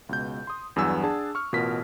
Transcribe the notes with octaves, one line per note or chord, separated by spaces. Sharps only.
C#2 B2 G6
C6 D#6
E2 G2 F#3 B3 G#5 E6
D4 G#4 F#5 A5
C#6 F6
A1 B2 F4 A#4 B6